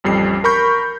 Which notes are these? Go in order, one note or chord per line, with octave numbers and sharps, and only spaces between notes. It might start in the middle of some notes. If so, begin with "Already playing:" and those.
A1 F2 G3 C7
A#4 B5 C#6 G6